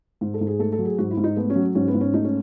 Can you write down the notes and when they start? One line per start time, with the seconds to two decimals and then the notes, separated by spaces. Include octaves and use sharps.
0.21 G#2
0.34 A4
0.41 G#2
0.47 G#4
0.59 A3 A4
0.72 A4
0.79 F#3
0.85 G#4
0.98 G#2 F#4
1.11 E4
1.17 G#2
1.24 D#4
1.37 A3 B3
1.50 C#4
1.56 F#3
1.75 G#2 C#4
1.88 B3
1.94 G#2
2.01 C#4
2.14 A3 D#4
2.24 C#4